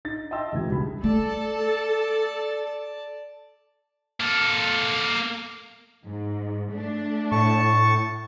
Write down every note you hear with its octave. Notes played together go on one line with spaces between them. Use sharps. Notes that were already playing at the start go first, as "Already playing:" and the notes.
D#4 A6
D#5 E5 G5 A5 C6 E6
A1 D2 B2 E3 G#3 G#6
C#2 G#2 G3 D4 F#4 B5
A3 A4 D5 A5
A#3 A4
G#2
A3 D4
A2 A5 C#6